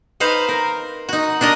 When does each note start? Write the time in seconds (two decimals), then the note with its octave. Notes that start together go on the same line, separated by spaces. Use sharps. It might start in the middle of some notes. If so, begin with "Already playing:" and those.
0.20 D#4 B4 C5 F5
0.49 A#4
1.09 D#4 F#4
1.41 D4 F#4 A#4 D#5